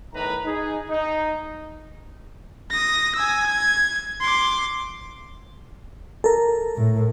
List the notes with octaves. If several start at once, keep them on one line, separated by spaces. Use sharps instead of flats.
E2 A2 D#3 B4 A#5
D#4 G#4
D#4
D#6 A#6
G#5 E6
G#6
C6 D6
A4 A#4
A2